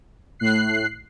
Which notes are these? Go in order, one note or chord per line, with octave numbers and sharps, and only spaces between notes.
A2 F#6 C7